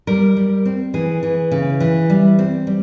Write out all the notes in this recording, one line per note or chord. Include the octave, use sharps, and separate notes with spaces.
G3 A#4
G3
C4
E3 G#4
E3
C#3
E3
G3
C4
G3